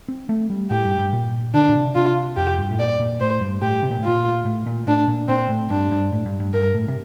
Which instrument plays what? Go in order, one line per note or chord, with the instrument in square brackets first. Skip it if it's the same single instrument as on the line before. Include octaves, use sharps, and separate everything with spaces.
[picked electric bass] C4
A3
G3
[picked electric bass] A2 [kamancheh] G4
[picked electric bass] G2
G2
A#2
[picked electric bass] D3 [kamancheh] D4
[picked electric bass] A#2
C3
[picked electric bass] C3 [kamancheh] F4
[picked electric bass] F2 [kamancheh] G4
[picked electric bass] G2
A2
[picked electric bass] A#2 [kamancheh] D5
[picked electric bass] A#2
[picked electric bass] A2 [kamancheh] C5
[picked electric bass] G2
[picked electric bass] A2 [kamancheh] G4
[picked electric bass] C3
A#2
A2
[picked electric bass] A#2 [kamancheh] F4
[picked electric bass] A2
A#2
[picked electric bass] A2 [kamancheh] D4
[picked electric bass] A#2
[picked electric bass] A#2 [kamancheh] C4
[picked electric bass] A2
[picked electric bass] G2 [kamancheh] D4
[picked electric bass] G2
A2
G2
G2
[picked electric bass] G2 [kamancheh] A#4
[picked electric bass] A2
C3